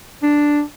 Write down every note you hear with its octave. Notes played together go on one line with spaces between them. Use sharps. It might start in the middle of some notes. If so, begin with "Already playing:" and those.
D4